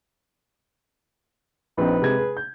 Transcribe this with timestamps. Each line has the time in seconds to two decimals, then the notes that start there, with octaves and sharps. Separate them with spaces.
1.78 A#1 C4 D#4 B4
2.02 C3 G#3 G#6
2.19 G#4
2.37 G6